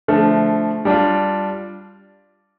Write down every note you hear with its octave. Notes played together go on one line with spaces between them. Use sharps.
D3 F3 A3
G3 D4 F4